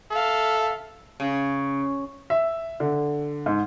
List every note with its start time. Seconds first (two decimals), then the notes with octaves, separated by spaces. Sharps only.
0.11 A4 E5 F5
1.20 C#3
2.30 E5
2.80 D3
3.46 G#2